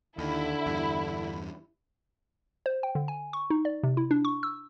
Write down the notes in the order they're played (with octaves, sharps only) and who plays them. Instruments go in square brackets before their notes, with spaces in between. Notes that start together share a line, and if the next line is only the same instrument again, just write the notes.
[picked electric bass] D#2 [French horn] D3 [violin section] E4
[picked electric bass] E2 G2
[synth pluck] C5
G5
D3
G#5
C#6
D#4
D5
C3
E4
D4
C#6
E6